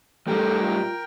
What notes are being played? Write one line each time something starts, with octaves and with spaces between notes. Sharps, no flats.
A2 G3 A4 A#4 G5
F4